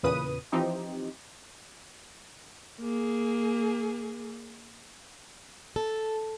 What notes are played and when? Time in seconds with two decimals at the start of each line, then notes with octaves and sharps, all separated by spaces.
0.03 E2 A#2 C#3 B4 D#6 D#7
0.52 E3 F3 C4 D#4 G4
2.81 A#3 G#4
5.76 A4